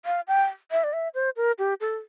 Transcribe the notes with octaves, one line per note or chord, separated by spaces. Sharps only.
F5
G5
E5
D5
E5
C5
A#4
G4
A4